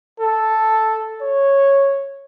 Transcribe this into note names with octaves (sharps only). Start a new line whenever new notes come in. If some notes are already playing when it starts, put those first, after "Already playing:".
A4
C#5